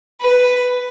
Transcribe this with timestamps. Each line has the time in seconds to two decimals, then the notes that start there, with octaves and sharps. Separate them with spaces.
0.21 B4